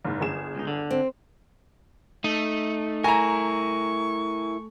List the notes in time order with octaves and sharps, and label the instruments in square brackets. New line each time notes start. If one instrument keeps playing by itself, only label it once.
[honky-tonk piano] F#1 G#2
G1 G#4 E7
[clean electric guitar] C#2 D#4
D3
[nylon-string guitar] C4
[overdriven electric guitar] A3 [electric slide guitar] D#4
[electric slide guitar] E4 A#4 [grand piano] G#5 A#5 [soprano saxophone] C#6